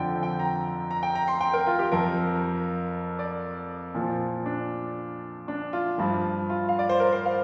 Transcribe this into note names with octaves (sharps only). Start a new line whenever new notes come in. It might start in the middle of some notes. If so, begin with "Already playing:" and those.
Already playing: F2 D3 F3 G5
G5
A#5
A#5
G5
A#5
C6
G5
A#4
F4
G4
F2 F3 A#4
D5
A#2 F3
D4
D4
F4
G2 F3
F4
F5
D5
C5
A#4
C5
F5